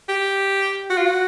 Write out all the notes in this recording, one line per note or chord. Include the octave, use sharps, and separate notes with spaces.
G4
F#4
F4
F#4